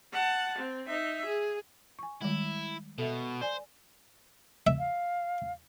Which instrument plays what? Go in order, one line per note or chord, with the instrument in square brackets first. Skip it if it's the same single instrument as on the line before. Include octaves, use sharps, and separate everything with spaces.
[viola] F#5 A5
C4
D#4 E5
G#4
[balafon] G#5 C#6
[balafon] D#3 G3 G#3 [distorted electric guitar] E4
[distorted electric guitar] B2 [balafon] A4 E5
[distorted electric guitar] C5 [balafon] D5 G#5
[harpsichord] E5
[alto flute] F5